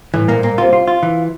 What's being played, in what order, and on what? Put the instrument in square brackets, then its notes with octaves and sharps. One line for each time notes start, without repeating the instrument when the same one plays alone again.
[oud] A2 [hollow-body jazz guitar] E3
[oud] A#2 [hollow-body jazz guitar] A#3
[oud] A#2 [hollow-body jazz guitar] A#3
[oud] C3 [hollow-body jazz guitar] F4
[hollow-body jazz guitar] F4
F4
E3